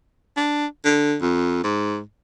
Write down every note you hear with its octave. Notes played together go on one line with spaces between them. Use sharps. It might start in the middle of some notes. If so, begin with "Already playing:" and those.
D4
D3
F2
G#2